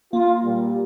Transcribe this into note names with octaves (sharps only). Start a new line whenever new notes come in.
A#3 F4
A#2 G3